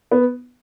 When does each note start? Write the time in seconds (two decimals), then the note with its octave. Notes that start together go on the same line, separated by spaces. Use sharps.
0.11 B3